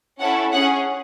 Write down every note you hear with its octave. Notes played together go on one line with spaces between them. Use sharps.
C#4 E4 A4 F#5
C#4 G#4 F#5